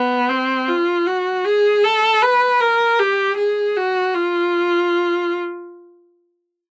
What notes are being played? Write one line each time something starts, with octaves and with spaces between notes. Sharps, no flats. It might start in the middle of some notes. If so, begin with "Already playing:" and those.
Already playing: B3
C4
F4
F#4
G#4
A4
B4
A#4
G4
G#4
F#4
F4